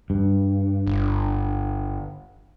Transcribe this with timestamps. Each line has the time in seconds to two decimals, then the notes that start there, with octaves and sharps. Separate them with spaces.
0.10 G2
0.87 G1